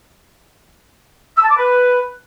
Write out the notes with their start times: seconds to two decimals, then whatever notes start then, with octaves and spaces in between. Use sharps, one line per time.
1.37 E6
1.44 A5
1.51 D6
1.57 B4